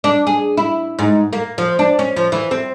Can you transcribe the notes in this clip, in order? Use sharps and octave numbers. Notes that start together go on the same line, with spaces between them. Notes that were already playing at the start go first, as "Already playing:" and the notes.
D4
G#4
E4
G#2
A#3
F3
D4
C#4
F3
E3
C4